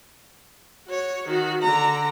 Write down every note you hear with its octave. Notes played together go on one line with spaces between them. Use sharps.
F#4 C#5
D#3 F#4
D3 A#5